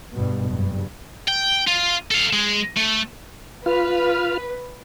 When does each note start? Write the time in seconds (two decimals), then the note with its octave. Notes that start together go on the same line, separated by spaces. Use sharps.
0.13 G1 G2 B2
0.47 F#1 G2
1.28 G5
1.67 F4
2.11 A4 F5
2.33 G#3
2.77 A3
3.66 F4 B4 F6